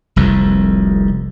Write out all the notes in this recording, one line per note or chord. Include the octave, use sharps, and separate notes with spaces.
F1 C2 F2